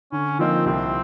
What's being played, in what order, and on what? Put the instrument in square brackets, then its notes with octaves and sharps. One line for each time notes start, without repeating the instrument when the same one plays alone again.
[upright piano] D3 [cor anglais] C#4
[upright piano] F3 A#3 D#4 [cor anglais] C4
[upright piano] C2 [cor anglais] C4